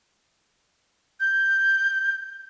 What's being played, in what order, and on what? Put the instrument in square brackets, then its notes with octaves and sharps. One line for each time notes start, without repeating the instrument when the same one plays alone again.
[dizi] G6